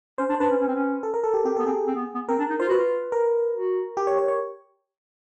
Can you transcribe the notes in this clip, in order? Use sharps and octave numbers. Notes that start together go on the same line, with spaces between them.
C#4 C5
D4
C5
D4 B4
C#4
C#4
C4
C#4
A4
A#4
A4
G4
C4 G4
B3 A4
C4 G#4
C4
B3
B3
C4 A#4
D4
D#4
F4 C5
F#4 B4
F4
A#4
F#4
G4
C#5
C#5
C#5